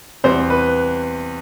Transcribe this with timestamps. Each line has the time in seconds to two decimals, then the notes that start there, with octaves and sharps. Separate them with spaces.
0.24 E2 C3 G3 C5
0.50 B4